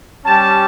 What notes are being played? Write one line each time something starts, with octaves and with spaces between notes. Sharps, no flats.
G3 C#4 G4 A5